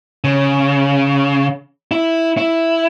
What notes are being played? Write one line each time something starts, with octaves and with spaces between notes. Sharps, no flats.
C#3
E4
E4